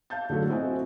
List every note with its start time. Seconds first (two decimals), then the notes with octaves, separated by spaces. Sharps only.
0.10 F5 A5 G6 A6
0.30 D3 F#3 A3 F#4 A4
0.49 C4 E4 F#4 D#5 G#5